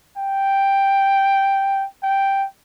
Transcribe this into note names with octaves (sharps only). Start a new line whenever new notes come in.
G5
G5